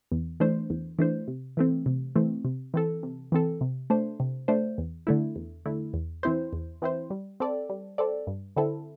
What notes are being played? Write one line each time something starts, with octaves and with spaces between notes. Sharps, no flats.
E2
E3 A3 D4 C5
E2
E3 A3 D4 C5
C3
E3 A3 C4
C3
E3 A3 C4
C3
E3 C4 A4
C3
E3 C4 A4
C3
A3 D4 C5
C3
A3 D4 C5
E2
D3 A3 E4
E2
D3 A3 E4
E2
E3 C4 E4 C5
E2
E3 C4 E4 C5
G3
C4 A4 D5
G3
C4 A4 D5
G2
D3 C4 E4 A4